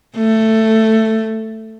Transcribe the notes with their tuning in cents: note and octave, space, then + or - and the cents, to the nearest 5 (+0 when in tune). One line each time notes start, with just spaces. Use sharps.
A3 +10